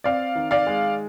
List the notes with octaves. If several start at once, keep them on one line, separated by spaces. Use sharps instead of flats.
C4 D5 F5
D#3
D5 F5
G#3